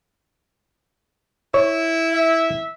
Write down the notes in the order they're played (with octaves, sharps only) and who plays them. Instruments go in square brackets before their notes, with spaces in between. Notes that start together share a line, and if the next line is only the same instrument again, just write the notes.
[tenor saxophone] E4 [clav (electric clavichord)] C#5
[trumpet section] E5